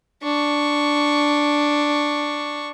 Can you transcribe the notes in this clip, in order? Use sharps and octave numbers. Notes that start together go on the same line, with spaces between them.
D4 C#6